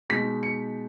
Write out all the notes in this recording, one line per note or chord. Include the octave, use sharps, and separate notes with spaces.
B2 G#3 D#4 B6
C#7